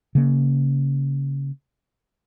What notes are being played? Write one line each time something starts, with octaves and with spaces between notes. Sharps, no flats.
C#3 A#3